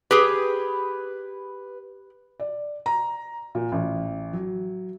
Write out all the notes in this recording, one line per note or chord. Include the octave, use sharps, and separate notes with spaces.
G4 G#4 B4
D5
A#5
A#2
A1
F#3